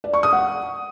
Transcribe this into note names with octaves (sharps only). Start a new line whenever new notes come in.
D5
C#6
D#6
F#5